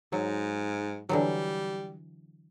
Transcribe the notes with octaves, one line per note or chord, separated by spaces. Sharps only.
G#2 F#3
D3 E3 F#3 G3